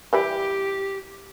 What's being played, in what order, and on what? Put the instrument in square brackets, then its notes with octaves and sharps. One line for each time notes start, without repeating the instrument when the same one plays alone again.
[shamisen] E3 G3 E4 [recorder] G4